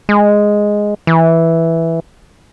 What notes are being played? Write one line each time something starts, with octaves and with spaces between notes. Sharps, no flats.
G#3
E3